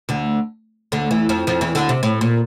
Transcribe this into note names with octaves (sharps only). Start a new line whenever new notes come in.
D2 D3
D2 D3
E2 E3
F2 F3
F2 F3
E2 E3
D2 D3
C3
A2
A#2